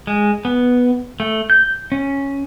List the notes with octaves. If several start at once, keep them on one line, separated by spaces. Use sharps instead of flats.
G#3
B3
A3
G6
C#4